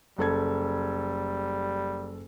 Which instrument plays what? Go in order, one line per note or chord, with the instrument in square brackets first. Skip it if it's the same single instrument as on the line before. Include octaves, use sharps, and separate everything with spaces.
[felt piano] F#1 A4 G#6 [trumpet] G3